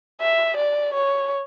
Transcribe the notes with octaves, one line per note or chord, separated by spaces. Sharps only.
E5
D5
C#5